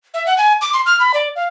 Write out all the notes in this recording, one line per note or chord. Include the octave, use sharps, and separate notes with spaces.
E5
F#5
G#5
D6
C6
F6
B5
D5
F5